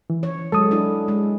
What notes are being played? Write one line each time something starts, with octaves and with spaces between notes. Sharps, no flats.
E3
C#5
F#3 G#3 A4 D#6
D4 E4
G#3